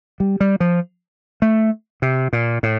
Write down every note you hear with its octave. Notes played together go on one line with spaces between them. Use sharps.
G3
G3
F3
A3
C3
A#2
A2